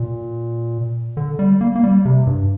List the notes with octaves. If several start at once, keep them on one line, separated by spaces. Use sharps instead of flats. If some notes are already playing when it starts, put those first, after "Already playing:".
Already playing: A#2
D3
G3
A#3
A#3
G3
C3
G2